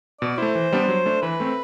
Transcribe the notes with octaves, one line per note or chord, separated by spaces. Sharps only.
B2 D5
A3 E4 C5
E3
G3 B3 D4
F#3
A3 D4
E3 B4
A3 C4